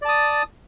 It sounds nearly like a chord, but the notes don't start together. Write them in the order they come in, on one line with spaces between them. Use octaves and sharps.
D5 A5 D#6